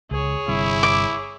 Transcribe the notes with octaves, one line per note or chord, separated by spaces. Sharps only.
C#2 G#4 C#5
G1 G2 C3 E4
D6